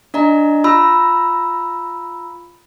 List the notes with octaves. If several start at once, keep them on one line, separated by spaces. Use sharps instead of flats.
D4 D5 D#5 A#5
F4 A#5 B5 E6